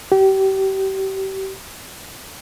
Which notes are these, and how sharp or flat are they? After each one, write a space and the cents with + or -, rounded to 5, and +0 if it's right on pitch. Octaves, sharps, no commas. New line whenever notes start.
G4 -30